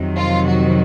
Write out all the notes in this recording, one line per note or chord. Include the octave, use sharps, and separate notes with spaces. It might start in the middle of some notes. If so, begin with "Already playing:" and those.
Already playing: F2 C3 D#3 F#3
F4
F#4